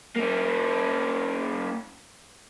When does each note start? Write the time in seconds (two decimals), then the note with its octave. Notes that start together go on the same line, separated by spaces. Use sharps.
0.16 A#3 C#4